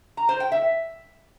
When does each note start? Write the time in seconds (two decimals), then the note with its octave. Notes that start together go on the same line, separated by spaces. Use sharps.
0.17 A#5
0.29 C5
0.40 G5
0.52 E5